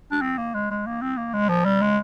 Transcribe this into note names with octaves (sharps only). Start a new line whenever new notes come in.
D4
C4
A#3
G#3
G#3
A#3
C4
A#3
G#3
F3
G3
G#3